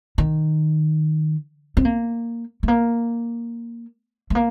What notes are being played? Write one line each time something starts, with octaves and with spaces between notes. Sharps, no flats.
D#3
C4
A#3
A3
A#3
A3
A#3